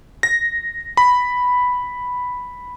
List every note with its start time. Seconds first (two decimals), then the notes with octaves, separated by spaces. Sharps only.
0.23 A#6
0.97 B5